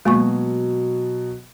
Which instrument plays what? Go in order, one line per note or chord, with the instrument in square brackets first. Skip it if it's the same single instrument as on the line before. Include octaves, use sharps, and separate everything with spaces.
[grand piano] B2 F#3 [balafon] G#3 A#3 C#6